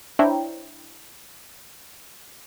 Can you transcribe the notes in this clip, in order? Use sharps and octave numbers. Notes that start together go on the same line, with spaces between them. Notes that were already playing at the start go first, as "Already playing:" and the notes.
D4 E4 C5 C#5 G5 A#5